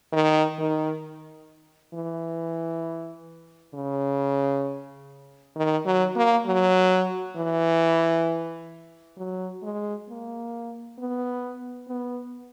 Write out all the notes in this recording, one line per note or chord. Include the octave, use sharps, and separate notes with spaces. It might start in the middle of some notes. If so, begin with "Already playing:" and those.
D#3
D#3
E3
C#3
D#3
F#3
A#3
F#3
E3
F#3
G#3
A#3
B3
B3